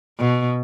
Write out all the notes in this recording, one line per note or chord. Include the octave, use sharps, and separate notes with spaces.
B2